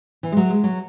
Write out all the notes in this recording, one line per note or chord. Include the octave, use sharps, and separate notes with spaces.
E3
G#3
F#3
G#3
F#3